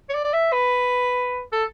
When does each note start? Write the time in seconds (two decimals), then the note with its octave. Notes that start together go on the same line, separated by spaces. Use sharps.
0.09 C#5
0.14 D5
0.24 D5
0.33 E5
0.53 B4
1.52 A4